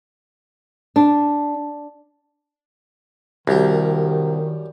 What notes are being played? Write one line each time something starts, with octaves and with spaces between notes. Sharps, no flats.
D4
C2 F#2 D#3 G3 A#4